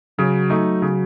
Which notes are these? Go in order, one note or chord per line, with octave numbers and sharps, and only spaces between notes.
C#3 F#3
A3 D#4
C#3